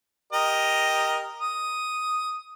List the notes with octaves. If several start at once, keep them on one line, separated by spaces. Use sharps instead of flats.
G4 A#4 D#5
D#6